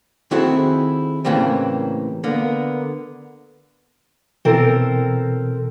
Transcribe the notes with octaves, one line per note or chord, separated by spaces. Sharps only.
D#3 C4 E4 F#4 G#4 A4
A2 C#3 E3 G3 A#3 C4
D3 A#3 B3
B2 E3 C4 A4 A#4